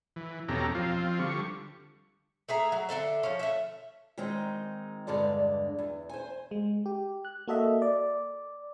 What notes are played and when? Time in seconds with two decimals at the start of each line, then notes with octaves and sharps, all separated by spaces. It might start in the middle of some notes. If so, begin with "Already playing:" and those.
0.16 E3
0.48 E2 B2 C#4 G4 A4 A#5
0.75 F3 C4 F4
1.19 D3 G3 C#6
2.49 A3 G#4 E5 A#5
2.72 F#3
2.89 D3 D#4 A4 E5
3.23 F3 C#4
3.39 A3 E5
4.18 D#3 G#3 C4 D#4
5.07 E2 G2 D3 G#3 D5
5.79 E2
6.09 C5 G#5
6.51 G#3
6.86 G4
7.25 F#6
7.48 A#3 F#4 A4 D#5 E5
7.82 D5